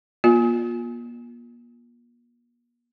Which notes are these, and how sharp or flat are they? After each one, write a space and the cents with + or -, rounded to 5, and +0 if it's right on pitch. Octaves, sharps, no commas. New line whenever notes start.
A#3 +40 F4 +20